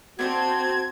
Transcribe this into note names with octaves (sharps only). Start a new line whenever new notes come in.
C4 D4 F#4 A4 C5 G#6